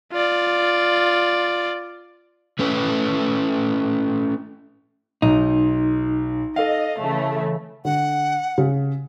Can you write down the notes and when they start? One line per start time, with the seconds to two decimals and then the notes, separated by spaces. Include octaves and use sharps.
0.13 F4 D5
2.59 A3 C#4 B4
5.22 B1 D#4
6.56 A4 D#5 F5
6.97 C#3 E3 A3
7.85 D3 F#5
8.58 C#3